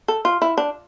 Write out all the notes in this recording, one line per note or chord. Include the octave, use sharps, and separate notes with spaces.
A4
F4
E4
D4